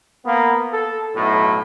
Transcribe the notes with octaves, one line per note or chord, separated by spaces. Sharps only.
A#3 B3
A4
B1 A2